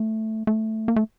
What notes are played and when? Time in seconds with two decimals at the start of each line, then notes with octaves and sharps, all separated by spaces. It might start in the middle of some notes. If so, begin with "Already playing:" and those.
Already playing: A3
0.47 A3
0.88 A#3
0.96 A3